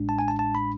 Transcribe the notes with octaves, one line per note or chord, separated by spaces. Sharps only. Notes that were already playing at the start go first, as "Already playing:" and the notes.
Already playing: A1 A2 G#3 D4
A5
G#5
A5
A5
B5